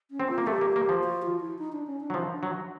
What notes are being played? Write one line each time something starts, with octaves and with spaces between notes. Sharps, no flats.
C#4
C4
F4
A#3
A3 G4
A#3
A#3
F3
F#4
F4
E4
D#4
D4
C#4
D4
F#3
F3 D#4
D4
F#3